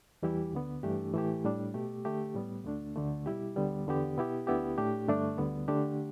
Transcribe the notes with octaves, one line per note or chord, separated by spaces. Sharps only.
E2 E3 G3 E4 G4
D2 D3 B3
G2 E3 A3 D4 G4
A2 E3 A3 E4 G4
A2 G3 D4
B2 A3 G4
D3 A3 G4
A2 G3 B3
D2 D3 A3 D4
D2 D3 A3
B2 G3 E4 G4
D2 D3 G3 B3
E2 D3 B3 G4
B2 B3 E4 G4
D2 D3 B3 E4 G4
A2 A3 D4 G4
G2 D3 A3 D4
D2 D3 G3 B3
D3 A3 D4 G4